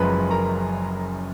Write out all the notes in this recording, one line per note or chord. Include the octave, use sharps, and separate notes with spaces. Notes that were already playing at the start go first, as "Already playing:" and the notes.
Already playing: F#1 F#2 F3 G#3 B4 A#5 B5
A#4 A#5